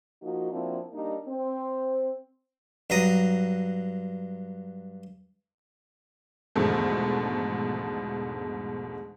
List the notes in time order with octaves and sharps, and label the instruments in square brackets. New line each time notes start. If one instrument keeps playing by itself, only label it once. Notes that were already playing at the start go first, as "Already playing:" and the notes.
[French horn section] F3 A#3 D#4 F#4
F3 A#3 C4 D4 E4 F#4
G3 A#3 D4 D#4
C4 C5
[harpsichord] G2 F#3 A#5 D#6
[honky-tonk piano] E2 G#2 B2 D3 F3 A3